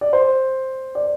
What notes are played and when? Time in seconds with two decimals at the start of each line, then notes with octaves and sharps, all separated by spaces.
0.01 D5
0.13 C5
0.95 D5